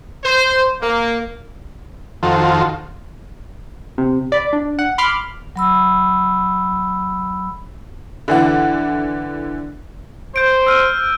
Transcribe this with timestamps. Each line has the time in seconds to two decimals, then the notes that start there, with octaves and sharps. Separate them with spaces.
0.24 C5
0.82 A#3
2.23 F2 D#3 F4 F#4 A4 C5
3.98 C3
4.32 D5 B5
4.53 D4
4.79 F#5
4.98 B5 C6 D6 F6
5.56 F#3 B5 E6
8.28 D3 E3 F#5
10.36 C5 G6 D7
10.66 E6 F6 D#7